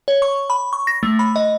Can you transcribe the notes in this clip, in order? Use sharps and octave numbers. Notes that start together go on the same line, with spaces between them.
C#5
C#6
B5
C#6
A#6
A3
B5
D#5